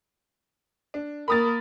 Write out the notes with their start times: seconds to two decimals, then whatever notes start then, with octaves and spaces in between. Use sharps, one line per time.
0.94 D4
1.28 A#3 A#4 B5 D#6 A6